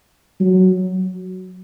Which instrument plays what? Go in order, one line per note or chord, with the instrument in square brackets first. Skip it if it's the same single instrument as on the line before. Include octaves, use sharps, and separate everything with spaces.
[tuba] F#3